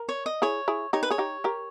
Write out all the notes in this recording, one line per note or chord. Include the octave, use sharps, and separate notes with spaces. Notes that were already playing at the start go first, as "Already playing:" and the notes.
Already playing: A#4
C#5
D#5
E4 G#4 C#5
E4 G#4
D#4 G4 C#5
B4
G#4 C#5
D#4 G4
G4 A#4